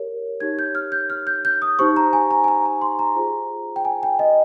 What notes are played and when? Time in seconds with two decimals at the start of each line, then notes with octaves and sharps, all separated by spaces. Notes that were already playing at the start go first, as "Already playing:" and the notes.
Already playing: G4 A#4 C#5
0.40 D#4 G4 C#5 G#6
0.59 G6
0.75 F6
0.92 G6
1.10 F6
1.27 G6
1.45 G6
1.62 D#6
1.79 D#4 G4 C5 C#6
1.96 A#5
2.13 G#5
2.31 A#5
2.44 G#5
2.48 A#5
2.65 A#5
2.81 C6
2.99 A#5
3.16 F4 G#4 C5
3.76 G5
3.85 G#5
4.03 G5
4.19 D#5